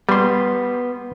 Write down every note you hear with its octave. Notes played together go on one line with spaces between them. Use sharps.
G3 B3 C6